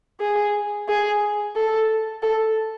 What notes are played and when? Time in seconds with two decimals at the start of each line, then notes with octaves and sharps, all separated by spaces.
0.20 G#4
0.89 G#4
1.56 A4
2.23 A4